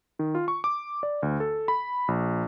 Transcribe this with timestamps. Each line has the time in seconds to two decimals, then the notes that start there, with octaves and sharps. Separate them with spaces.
0.19 D#3
0.35 F4
0.48 C#6
0.64 D6
1.03 D5
1.23 D2
1.40 A4
1.68 B5
2.08 A#1